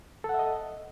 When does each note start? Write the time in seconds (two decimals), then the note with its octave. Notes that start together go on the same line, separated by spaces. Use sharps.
0.24 A4
0.29 F#5
0.34 E5
0.39 D#5